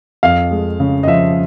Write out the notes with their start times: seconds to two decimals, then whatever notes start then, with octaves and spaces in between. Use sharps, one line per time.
0.23 F2 F5
0.51 G#3
0.80 C#3
1.03 D#5
1.07 F3 E5